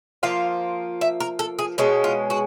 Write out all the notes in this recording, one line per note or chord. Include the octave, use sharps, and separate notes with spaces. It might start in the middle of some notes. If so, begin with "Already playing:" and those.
F3 A#3 F4 F5
E5
A#4
A4
G#4
B2 G#3 C#4
F4
F#4